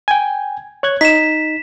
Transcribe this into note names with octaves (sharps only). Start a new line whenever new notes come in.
G5 G#5
C#5 F#6 G#6
D#4 B6 E7